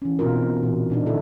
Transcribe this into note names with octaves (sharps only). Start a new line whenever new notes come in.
E3 C#4
B2 C4 D#4 F4 A#4
A#2 E3
A#2 D4 D#4
D3 E4 A4